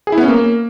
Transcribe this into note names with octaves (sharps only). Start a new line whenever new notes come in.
G#4
E4
B3
C#4
A#3